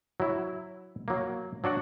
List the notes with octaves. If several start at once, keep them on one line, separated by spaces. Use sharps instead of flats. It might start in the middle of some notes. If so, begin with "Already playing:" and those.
F#3 E4
F#3 A#3
F#3 D4 F#4 F#5